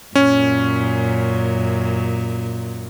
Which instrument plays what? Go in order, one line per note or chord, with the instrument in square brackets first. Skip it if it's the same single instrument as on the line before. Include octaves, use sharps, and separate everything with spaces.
[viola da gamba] F#2 A#2 [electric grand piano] C#4